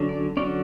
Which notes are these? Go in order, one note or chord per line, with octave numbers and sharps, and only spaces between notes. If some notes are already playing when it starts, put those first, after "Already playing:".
Already playing: D3 F#3 C#4
D5
D3 F#3 C#4 D5